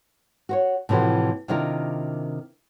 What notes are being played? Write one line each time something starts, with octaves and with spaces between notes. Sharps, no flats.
F#4 C5 C#5
A2 C3 E3 F3 F#4
C3 D#3 D4 E4 F4 A#4